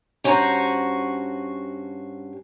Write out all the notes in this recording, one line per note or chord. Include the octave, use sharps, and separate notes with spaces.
G2 C#4 F#4 C5 A#5